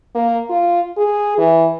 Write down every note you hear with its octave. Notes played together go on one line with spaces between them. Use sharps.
A#3
F4
G#4
E3